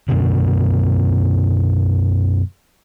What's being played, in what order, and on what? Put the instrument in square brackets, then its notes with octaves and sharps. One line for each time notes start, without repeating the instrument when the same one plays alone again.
[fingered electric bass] F#2 B2 D3